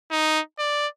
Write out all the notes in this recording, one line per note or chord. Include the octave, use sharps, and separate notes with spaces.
D#4
D5